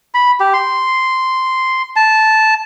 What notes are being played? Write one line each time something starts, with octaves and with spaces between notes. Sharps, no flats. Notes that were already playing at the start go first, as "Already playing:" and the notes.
B5
G4
C6
A5